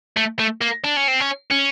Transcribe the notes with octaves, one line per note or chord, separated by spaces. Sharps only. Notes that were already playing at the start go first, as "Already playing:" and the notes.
A3
A3
A#3
D4
C#4
C4
C#4
C#4